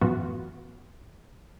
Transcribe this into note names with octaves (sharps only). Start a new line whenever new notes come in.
F#2 A2 E3 B3 F4 F#4